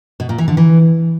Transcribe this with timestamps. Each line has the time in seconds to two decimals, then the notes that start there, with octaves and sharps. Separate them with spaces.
0.20 B2
0.29 A#2
0.38 E3
0.48 D3
0.57 E3